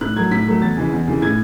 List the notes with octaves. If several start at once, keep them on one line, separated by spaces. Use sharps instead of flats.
A2 F#6
F#3 A3 G#6
A2 B6
F#3 A3
E2 A6
C#3 E3 G#3
E2
C#3 E3 G#3
A2 G#6